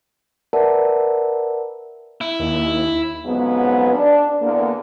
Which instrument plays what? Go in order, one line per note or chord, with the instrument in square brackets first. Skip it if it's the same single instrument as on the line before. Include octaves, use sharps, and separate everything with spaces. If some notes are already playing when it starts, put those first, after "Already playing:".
[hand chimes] A#4 B4 D5 E5 F#5 A5
[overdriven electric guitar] E4
[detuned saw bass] D#2
[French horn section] F2 G#2 C#3 F#3 B3
D4
E2 D3 A#3